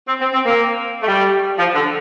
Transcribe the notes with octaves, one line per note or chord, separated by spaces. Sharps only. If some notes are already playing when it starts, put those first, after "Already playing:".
C4
C4
C4
A#3
A3
G3
F3
D3